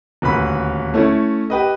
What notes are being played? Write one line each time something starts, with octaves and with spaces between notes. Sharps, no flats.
D#1 D2 B4 B5
A3 C#4 E4
G4 B4 D#5